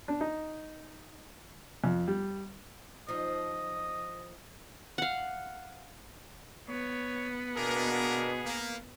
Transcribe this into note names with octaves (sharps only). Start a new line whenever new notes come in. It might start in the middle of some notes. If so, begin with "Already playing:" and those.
D4
D#4
F2
G3
F3 D#4 D#5
F5 F#5
B3 C#5
B2 A#3 D4 G#4 A#4
A#3